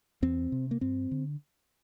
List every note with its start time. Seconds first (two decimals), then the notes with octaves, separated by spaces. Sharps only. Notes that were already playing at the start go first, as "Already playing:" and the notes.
0.22 E2 C4
0.52 C3
0.71 A#3
0.81 G2 C4
1.11 D3